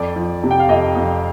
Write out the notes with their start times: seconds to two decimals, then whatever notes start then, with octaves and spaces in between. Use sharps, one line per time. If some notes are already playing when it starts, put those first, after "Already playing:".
Already playing: F2 D5
0.16 F3
0.43 C3
0.51 G5
0.59 F5
0.69 F2 D#5
0.96 F2